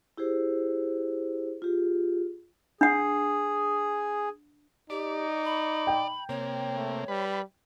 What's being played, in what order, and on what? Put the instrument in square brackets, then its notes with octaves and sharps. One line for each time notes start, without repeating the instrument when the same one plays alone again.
[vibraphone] E4 G4 G#4 C5
F4 G4 G#4
[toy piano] D4 F#5 [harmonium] G#4
[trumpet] D#4 [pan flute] G4 [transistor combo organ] D5
[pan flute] B5
[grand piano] G5
[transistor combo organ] C3 A#3 [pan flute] C#5
[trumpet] A3
[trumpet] G3 [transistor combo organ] B4